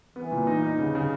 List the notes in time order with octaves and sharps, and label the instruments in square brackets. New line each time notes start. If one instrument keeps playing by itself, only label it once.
[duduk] E3 [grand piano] B3
[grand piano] A#2
D#4
D#4
C#3
C#3